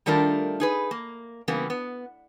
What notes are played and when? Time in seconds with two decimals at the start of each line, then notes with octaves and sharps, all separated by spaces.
0.06 D#3 G3 A3 D4 F4 A#4
0.60 D#4 G#4 B4
0.91 A#3
1.48 C#3 E3 G3 A#3 B3
1.70 B3